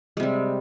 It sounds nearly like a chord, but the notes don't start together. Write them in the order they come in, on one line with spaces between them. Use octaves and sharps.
G#3 C3 G3